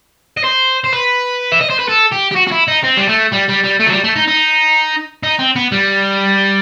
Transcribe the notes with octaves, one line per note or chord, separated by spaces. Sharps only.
D#5
C5
C5
B4
E5
D#5
C5
B4
A4
G4
G4
F#4
F#4
E4
D#4
C4
G3
A3
G3
G3
G3
A3
F#3
G3
A3
D#4
D#4
D#4
C4
B3
G3